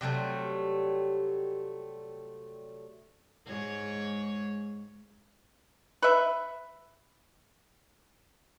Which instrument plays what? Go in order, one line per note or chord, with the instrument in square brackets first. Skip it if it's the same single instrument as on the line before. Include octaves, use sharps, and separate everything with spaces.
[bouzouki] C3 F#3 G3 A3
[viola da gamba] G#2 G#3 C#5
[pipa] B4 E5